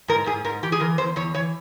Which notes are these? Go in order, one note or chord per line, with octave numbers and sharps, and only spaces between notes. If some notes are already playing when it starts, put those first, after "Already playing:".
G#2 A#4
G#2 G#4
G#2 A#4
E3 G4
G#4
E3 A#4
E2 C5
E2 C#5
E3 C#5